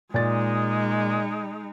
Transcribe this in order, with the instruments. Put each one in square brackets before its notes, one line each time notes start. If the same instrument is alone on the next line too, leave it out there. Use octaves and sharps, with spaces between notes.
[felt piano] A#2 A6 [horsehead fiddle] G#3 D#4